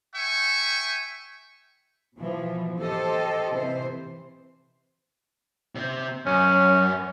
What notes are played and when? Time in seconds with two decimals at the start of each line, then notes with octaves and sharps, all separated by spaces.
0.15 E5 G5 G#5 C#6
2.17 B2 E3 F3
2.79 G4 A4 C5 D#5
3.53 C3 E3 C5
5.75 C3 C4
6.26 F#2 C#4